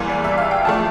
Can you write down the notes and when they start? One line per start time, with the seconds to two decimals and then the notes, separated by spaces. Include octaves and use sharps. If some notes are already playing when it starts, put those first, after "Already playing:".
Already playing: E2 E3 G3 A#3 C6
0.09 D5
0.24 E5
0.38 F5
0.51 G5
0.65 F3 A3 A5